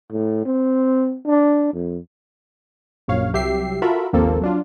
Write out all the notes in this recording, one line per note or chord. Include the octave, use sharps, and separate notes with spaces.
A2
C4
D4
F2
A#1 F#2 C#5 F5
C2 F#3 G4 E5 C7
F4 F#4 A4 A#4 E5 B5
G#1 D#2 F3 A#3 C4 A4
F#3 D4 F4